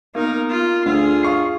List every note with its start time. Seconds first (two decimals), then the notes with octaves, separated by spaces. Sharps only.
0.15 A#3 B3 D#4 A#4
0.50 F4
0.86 D2 D4 F4 G#4
1.23 F5 C#6 C7